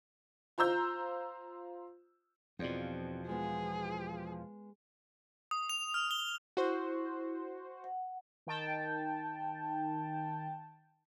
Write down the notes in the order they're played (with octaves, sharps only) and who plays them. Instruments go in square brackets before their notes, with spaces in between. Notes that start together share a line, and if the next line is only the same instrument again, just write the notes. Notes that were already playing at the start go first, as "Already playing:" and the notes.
[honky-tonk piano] F4 C5 A#5 E6 G6
[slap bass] E2 B2 [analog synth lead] F3 [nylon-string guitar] C4 D5
[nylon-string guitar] G#3 B3 [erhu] G#4
[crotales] D#6
F7
F6
G7
[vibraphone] E4 [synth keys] F#4 C5
[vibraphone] F#5
[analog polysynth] D#3 G5 A5